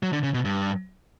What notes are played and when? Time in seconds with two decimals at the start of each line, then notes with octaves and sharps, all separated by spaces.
0.03 F#3
0.13 D3
0.23 C#3
0.34 B2
0.45 G2